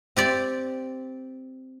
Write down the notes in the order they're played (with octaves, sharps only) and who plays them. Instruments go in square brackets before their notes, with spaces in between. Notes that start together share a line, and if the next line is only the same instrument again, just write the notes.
[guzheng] C4 G4 D5